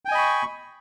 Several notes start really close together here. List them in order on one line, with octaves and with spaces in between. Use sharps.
G5 G#5 D#5 B5 C#6